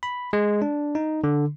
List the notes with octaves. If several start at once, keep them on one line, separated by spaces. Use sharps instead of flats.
B5
G#3
D4
D#4
D3